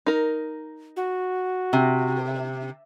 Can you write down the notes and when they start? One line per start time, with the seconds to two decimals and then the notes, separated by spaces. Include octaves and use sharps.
0.06 D#4 A#4
0.96 F#4
1.73 C3